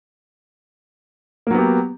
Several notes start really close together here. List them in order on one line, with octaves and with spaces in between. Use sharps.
A#3 F#3 B3 G4